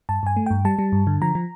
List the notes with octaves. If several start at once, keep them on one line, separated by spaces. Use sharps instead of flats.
G2 A5
G2 G#5
A3
G2 G5
G3 A5
G3
G2
D3
F3 A#5
F3